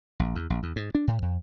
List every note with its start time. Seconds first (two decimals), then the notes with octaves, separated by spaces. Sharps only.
0.20 A#1
0.35 E2
0.50 A#1
0.63 E2
0.76 G#2
0.95 D4
1.08 A2
1.22 F2